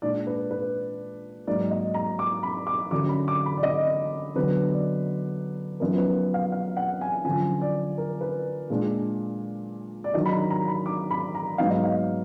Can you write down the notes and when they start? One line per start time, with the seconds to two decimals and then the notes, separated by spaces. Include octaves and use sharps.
0.02 A#2 G#3 D4 D5
0.27 B4
0.51 B4
1.47 G#2 F#3 A#3 D#4 D5
1.71 D#5
1.94 A#5
2.19 D6
2.43 B5
2.67 D6
2.91 F#2 D3 F#3 D6
3.09 B5
3.28 D6
3.46 B5
3.57 D5
3.63 D#5
4.35 D3 F#3 B3 D4 B4
4.73 D5
5.80 F#2 F3 B3 D#4 A#4
5.98 B4
6.34 F5
6.52 F5
6.77 F#5
7.01 G#5
7.24 F#2 D3 F3 G#5
7.62 D5
7.98 A#4
8.21 B4
8.70 A#2 G#3 D4
10.04 D5
10.14 D#3 F#3 D4 D#5
10.26 B5
10.32 A#5
10.51 A#5
10.68 B5
10.86 D6
11.11 B5
11.35 A#5
11.58 G#2 F#3 B3 D#4 F5
11.70 D#5
11.83 F5